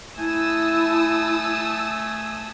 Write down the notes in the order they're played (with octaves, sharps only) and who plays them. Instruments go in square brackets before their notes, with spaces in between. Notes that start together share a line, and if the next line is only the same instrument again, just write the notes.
[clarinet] A3 [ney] E4 [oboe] G#5 [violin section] A5 D#6 E6